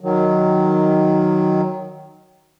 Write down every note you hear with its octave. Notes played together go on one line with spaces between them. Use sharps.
D#3 F#3